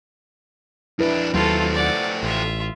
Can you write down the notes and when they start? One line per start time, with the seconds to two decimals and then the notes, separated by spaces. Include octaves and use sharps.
0.99 F2 D4 E4 B4
1.34 D#2 F#3 A3 C4 F4 A4
1.74 D5 F#5
2.23 A1 F4 E5